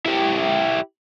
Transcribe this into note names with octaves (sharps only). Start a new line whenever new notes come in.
E4 G4